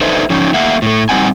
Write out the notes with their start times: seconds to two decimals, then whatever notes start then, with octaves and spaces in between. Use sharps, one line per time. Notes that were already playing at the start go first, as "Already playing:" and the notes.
0.01 D4 D#4 A4 B4 C5 E5
0.30 F3 C#4 D#4
0.54 A3 A#3 E5 F#5
0.82 A2 A3
1.09 G3 C4 D#4 F#5 G#5